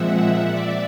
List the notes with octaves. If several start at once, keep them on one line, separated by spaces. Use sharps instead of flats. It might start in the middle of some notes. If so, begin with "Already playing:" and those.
Already playing: A#2 F3 G#3 C4 E5 F#5
D5 E5